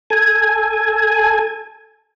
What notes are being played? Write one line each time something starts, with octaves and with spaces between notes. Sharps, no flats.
A4 G#5